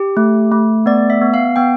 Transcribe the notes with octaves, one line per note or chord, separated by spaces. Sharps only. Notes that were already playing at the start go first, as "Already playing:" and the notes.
Already playing: G4
A3
A3
B3 D5
E5
B3
F5
B3 G5